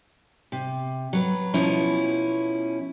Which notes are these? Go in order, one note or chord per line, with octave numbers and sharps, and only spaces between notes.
C3
F#3 B4
B2 F3 C#4 E4